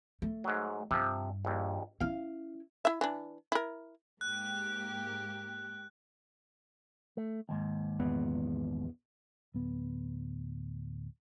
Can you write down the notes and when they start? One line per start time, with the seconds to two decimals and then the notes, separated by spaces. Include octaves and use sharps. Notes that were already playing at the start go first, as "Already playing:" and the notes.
0.22 A3
0.44 G#2 F#3
0.91 G2 C3 F3
1.45 A#1 D#2
2.00 C#4 E4 F5
2.85 E4 E5
3.01 E3 D4
3.52 E4 A#4
4.21 G#2 A#3 G4 F#6
7.17 A3
7.49 D#2 G#2
7.99 A#1 E2 B3
9.54 D1 B3